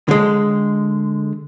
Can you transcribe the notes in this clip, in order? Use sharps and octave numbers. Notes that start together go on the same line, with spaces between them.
D3 G#3